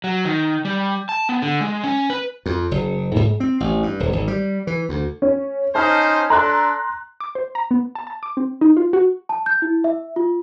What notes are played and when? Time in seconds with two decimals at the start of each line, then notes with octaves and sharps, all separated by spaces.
0.04 F#3
0.25 D#3
0.65 G3
1.09 A5
1.29 B3
1.42 D3
1.61 G#3
1.84 C#4
2.10 B4
2.46 F2
2.71 F#1
3.16 G#2
3.40 C4
3.60 A1
3.82 G2
4.00 D#1
4.12 G#1
4.28 G3
4.67 E3
4.89 D2
5.22 C#4
5.75 C#4 D#4 C5 A5 F6
6.30 D4 A4 A#5 C6 F#6
7.20 D6
7.35 C5
7.55 A#5
7.71 B3
7.95 A5
8.07 A5
8.23 D6
8.37 C4
8.61 D#4
8.77 F4
8.93 F#4
9.29 A5
9.46 G6
9.62 E4
9.84 E5
10.16 F4